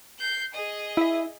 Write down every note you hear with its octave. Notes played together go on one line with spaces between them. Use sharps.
G6 C7
G#4 D#5
E4 E5